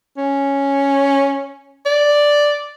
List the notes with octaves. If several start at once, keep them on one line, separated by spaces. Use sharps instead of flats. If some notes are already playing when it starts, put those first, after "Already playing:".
C#4
D5